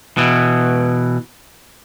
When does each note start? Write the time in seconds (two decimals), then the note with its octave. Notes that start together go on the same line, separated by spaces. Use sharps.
0.17 B2 E3